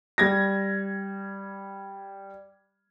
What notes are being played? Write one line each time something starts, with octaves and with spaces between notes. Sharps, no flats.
G3 G#6 A#6